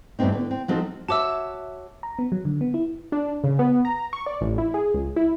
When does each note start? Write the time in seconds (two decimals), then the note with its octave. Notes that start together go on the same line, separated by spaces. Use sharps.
0.19 E2 G2 A3 B3 C4 D#4
0.32 D3 B3
0.51 C4
0.68 F3 F#3 C4 D#4 A4
1.08 F#4 C#5 E5 A5 D6 E6
2.03 A#5
2.19 B3
2.32 F#3
2.45 D3
2.61 B3
2.74 E4
3.12 D4
3.44 C#3
3.59 B3
3.85 A#5
4.13 C#6
4.26 D5
4.41 A1
4.58 E4
4.74 G#4
4.94 C#2
5.16 E4